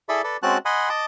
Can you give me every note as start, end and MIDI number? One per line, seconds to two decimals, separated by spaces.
0.09 0.22 64
0.09 0.22 68
0.09 0.22 69
0.09 0.22 74
0.09 0.22 76
0.09 0.22 83
0.24 0.37 69
0.24 0.37 71
0.24 0.37 74
0.43 0.58 56
0.43 0.58 60
0.43 0.58 61
0.43 0.58 66
0.43 0.58 81
0.43 0.58 90
0.65 0.89 75
0.65 0.89 78
0.65 0.89 80
0.65 0.89 83
0.65 0.89 84
0.89 1.06 75
0.89 1.06 81
0.89 1.06 86